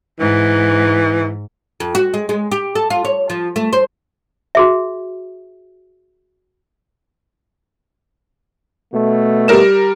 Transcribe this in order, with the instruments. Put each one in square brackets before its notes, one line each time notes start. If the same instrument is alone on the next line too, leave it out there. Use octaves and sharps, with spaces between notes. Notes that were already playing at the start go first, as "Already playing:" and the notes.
[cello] G#2 [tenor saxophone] E3
[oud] F2
F#4
G#3
G#3
G4
A4
F4
C#5
F3
A3
C5
[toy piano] F#4 G#4 E5
[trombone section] B2 A3
[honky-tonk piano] G3 A#4 E7